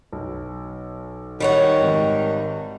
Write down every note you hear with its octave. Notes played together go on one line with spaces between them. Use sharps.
B1
D#3 G3 C#5 F#5
G#1